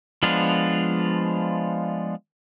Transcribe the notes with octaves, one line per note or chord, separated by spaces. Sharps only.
F3 G#3 B3 D4 F4